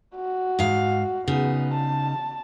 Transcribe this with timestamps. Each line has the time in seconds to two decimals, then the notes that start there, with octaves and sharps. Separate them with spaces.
0.15 F#4
0.59 G#2 F5
1.28 C#3 B3 D#4
1.74 A5